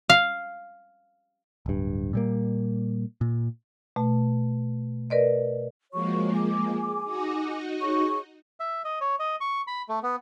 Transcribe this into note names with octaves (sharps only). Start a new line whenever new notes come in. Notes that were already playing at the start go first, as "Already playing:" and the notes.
F5
D1 G2
A#2 G3 A#3
A#2
B2 A3
A#4 B4 D5 D#5
F3 G#3 A#3 F#4 C#5 C#6
G#4 G#5 D6
D#4 F#4 D#5
G#4 C#5 C#6
E5
D#5
C#5
D#5
C#6
B5
A3
B3